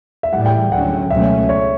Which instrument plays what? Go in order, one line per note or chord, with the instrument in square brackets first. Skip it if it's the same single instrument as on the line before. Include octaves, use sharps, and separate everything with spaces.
[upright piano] E5
[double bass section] A2 E3 G3 [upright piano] F#5
[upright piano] G5
[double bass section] D2 D3 F#3 C#4 [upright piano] F#5
[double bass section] C#2 B2 F#3 A3 C#4 [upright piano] E5
[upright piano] C#5